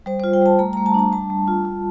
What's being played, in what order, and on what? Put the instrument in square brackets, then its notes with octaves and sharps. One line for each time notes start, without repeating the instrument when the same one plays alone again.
[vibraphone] G3 C5
F4 C5
G5
G3 A5
A3 A#5
A3 A#5
A5
D4 A#5
G3 A5
G3
F4
F4